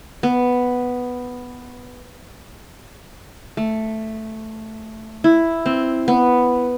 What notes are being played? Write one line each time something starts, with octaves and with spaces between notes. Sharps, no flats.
B3
A3
E4
C4
B3